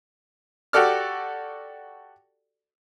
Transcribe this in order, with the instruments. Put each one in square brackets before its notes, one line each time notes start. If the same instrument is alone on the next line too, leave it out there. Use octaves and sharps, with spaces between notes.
[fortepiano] F#4 G4 A4 D5 F6